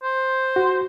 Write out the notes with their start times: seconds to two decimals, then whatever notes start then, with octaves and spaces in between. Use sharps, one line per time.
0.03 C5
0.56 F#4